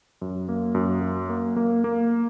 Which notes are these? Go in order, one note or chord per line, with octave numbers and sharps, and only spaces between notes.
F#2
A#3
F#2
F#3
A#3
A#3
A#3